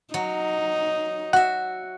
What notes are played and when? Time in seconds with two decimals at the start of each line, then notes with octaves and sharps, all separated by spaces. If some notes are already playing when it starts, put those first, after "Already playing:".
0.14 F#3 D#4
1.33 F#4 E5 F#5